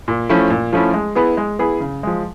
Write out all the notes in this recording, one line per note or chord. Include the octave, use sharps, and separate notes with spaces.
A#2
F3 A3 C#4 E4
A#2
F3 A3 C#4 E4
G#3
B3 E4 G#4
G#3
B3 E4 G#4
C#3
F3 G#3